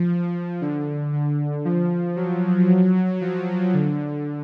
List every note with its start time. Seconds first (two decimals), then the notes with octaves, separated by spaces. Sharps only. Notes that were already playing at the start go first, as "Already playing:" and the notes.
Already playing: F3
0.61 D3
1.13 D3
1.65 F3
2.16 F#3
3.21 F3
3.74 D3